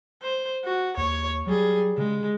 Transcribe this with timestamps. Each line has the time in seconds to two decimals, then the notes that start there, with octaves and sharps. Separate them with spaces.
0.22 C5
0.65 F#4
0.97 D#2 C#5
1.47 F#3 G3 G#4
1.98 C#3 G#3